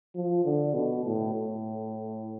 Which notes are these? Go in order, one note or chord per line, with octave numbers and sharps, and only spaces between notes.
F3
D3
B2
A2
A2